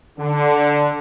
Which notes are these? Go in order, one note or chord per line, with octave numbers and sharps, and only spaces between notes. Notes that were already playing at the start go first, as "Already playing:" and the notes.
D3